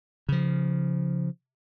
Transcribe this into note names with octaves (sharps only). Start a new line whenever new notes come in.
C#3 F3